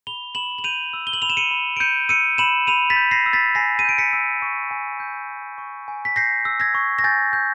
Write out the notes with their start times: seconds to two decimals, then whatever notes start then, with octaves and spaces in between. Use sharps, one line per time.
0.07 B5 F7 G7
0.35 B5 E7 F#7
0.58 F#7
0.64 G6 D#7 F7
0.93 E6
1.07 G7
1.13 F#7
1.22 B5 F7
1.29 E7
1.37 C#7 D#7
1.51 B5
1.77 D7
1.80 G6 C#7 D#7
2.09 E6 C#7 D#7
2.38 B5 E7 F#7
2.67 B5 D#7 F7
2.90 A6 B6
2.96 G6
3.11 A#6 C7
3.26 E6
3.33 A6 B6
3.55 G#5 A#6 C7
3.79 D#7
3.85 G6 D7
3.98 B6 C#7
4.13 E6
4.42 C#6
4.71 G#5
5.00 G6
5.29 E6
5.58 C#6
5.88 G#5
6.05 B6
6.16 G6 A#6 C7
6.45 E6
6.60 G#6 A#6
6.75 C#6
6.99 A#6
7.04 G#5 G6 A6
7.33 G6